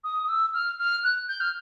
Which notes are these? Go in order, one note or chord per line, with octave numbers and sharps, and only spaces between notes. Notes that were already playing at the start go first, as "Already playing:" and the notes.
D#6
D#6
E6
F6
F6
F#6
G6
F6